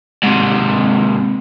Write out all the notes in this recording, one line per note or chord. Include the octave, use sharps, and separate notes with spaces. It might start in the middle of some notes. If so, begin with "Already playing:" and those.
G#2 C3